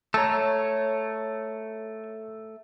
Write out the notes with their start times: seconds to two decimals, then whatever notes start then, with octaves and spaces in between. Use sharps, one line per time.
0.14 A3 C#5 A5 A#5 E6